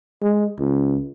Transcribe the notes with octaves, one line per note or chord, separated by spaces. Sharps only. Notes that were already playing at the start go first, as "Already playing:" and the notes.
G#3
C#2